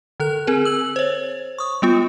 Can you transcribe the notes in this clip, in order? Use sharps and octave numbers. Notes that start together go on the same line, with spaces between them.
D3 A4 F#6
C4 G#4 A#4
E6 F#7
C5 C#5
C#6 D#6
G3 B3 F4